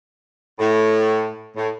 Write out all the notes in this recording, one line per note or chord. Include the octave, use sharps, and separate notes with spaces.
A2
A2